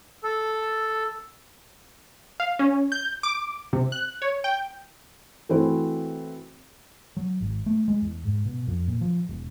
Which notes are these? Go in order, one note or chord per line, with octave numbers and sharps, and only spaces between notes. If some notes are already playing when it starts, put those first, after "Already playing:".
A4
F5
C#4
G6
D6
C3
F#6
C#5
G5
E3 A3 C4 E4 F#4 C5
F#3
G#1
A3
G#3
E2
G#2
B2
F2
A#2
F3
E1